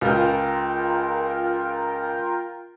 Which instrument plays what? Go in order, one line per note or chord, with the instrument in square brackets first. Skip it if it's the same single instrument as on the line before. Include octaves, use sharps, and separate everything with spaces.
[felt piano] C#2 [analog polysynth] F4 A#4 G5